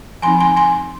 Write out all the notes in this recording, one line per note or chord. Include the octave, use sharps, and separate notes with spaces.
F3 C4 D#4 G#5 C6
G#5 C6
G#5 C6